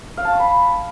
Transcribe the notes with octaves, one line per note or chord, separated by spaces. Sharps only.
F5
A5
C#6
B5